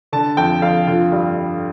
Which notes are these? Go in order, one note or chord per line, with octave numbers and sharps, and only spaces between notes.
D3 A5
F2 G5
F2 F5
D3 F4
G2 G4
G2